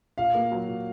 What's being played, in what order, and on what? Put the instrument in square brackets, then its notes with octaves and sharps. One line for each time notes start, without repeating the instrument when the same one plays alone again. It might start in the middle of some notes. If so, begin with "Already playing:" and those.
[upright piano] A#2 F5
A#3
F#3
A#2